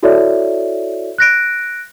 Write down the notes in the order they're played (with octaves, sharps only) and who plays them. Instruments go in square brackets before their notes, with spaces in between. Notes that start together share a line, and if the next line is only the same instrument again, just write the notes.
[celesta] E4 F#4 A4 C#5 D5 E5
F#6 A#6 D7